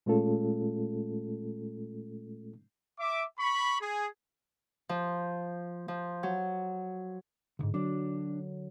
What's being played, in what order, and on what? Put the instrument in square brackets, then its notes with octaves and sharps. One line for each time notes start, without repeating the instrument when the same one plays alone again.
[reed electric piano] A#2 G#3 A3 C#4 F4 A4
[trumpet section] E5 D6
B5 C#6
G#4
[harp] F3
F3
F#3
[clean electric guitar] C2 G#2 [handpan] D3
[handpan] F#3 [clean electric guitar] D4